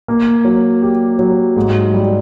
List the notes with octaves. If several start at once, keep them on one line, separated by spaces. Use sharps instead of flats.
A#3
F#3
G4
F#3
G#2
G3